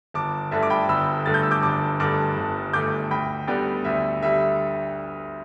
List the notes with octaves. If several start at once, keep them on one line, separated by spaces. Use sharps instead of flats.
G1 A5 D6
G2 D3 A3 E5 A5
D6
G5 B5
G1 B5 E6
G2 D3 A3 A6
G6
E6
D6 G6
G1 A5 D6
G2 D3 A3 A5 D6
G1
G2 D3 A3 D6 G6
D2 G5 B5
D3 G3 B3 D5 G5
D2 E5
D3 G3 E5